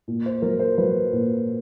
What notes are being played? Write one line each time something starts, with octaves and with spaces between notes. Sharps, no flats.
A#2
C5
F#3 A#4
C5
F#3 B4
A#2